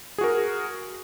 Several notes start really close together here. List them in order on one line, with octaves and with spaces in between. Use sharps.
G#4 F#4 A#4